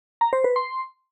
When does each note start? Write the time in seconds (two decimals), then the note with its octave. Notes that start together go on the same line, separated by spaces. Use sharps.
0.21 A#5
0.33 C5
0.44 B4
0.56 C6